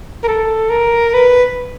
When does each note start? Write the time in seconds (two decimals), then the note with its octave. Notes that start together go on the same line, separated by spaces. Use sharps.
0.24 A#4
0.28 A4
0.70 A#4
1.14 B4